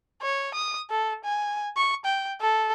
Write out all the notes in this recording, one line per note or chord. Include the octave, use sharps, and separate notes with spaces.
C#5
D#6
A4
G#5
C#6
G5
A4